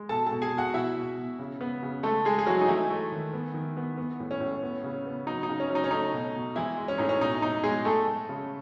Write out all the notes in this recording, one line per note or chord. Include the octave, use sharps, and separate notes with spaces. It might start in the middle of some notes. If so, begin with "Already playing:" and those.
Already playing: G#3
B2 A4 A5
B2 A4 A5
G#4 G#5
B2
F#4 F#5
B2 E4 E5
B2
B2
C#3
B3
C#3
G#3 A3 A4
G#3 G#4
G#4
E3 F#3 F#4
D#4
E3 A3 E4
A3
D#3
B3
D#3
B3
B3
A2
C#4
A2
B3
C#3
B3
F#3 D#4
D#4
C#3
C#4
F#3 D#4
C#4
A3 D#4
B2
B2
E3 G#3 E4
G#3
C#4
A2 D#4
C#4
B2 D#4
B2 D#4
B2 G#3 G#4
A3 A4
A3
C#3